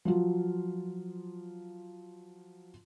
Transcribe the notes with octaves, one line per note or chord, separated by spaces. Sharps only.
F3 F#3 F4